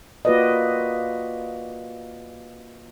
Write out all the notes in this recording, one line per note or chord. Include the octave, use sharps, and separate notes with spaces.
A#3 F4 F#4 B4 D5 D#5